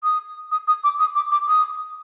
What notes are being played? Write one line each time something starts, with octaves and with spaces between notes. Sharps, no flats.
D#6
D#6
D#6
D6
D#6
D6
D6
D#6